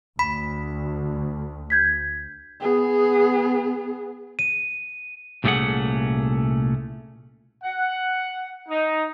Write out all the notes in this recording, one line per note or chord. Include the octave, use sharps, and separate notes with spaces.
D2 B5 B6
G6 G#6 B6
B3 G#4
D#7
C2 A#2 A3 C#4 G#4 F#5
F#5
D#4